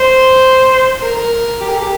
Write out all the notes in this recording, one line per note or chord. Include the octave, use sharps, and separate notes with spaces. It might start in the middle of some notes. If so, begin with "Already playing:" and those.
Already playing: C5
A#4
A#4
G4
A#4
G4